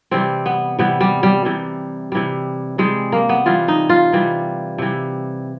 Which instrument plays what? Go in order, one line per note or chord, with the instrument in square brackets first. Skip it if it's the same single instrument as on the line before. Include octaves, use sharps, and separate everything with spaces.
[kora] C3 E3 G3 C4
B3
C3 E3 G3 B3
G3
G3
C3 E3 G3
C3 E3 G3
C3 E3 G3 G#3
A#3
B3
C3 E3 G3 F4
D#4
F4
C3 E3 G3
C3 E3 G3